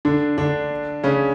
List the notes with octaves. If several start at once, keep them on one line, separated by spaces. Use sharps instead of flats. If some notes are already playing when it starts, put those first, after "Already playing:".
D3 D4
D3 D4
C#3 C#4